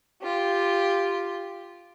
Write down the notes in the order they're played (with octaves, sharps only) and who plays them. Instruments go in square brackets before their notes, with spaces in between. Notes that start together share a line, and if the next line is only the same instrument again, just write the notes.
[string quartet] F4 G4